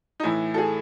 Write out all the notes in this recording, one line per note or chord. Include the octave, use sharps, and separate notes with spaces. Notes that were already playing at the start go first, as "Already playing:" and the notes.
D#4
A2 E3 E4
A4
G#4